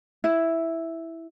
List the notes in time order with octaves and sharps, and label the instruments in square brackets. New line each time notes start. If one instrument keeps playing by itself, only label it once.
[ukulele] E4